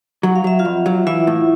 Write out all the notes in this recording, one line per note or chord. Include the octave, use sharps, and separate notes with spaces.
F#3 F#5
F5
F#3 E5
F4 F5
F2
F#3
E3 E4 E5
A2